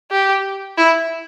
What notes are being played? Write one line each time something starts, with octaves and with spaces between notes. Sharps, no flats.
G4
E4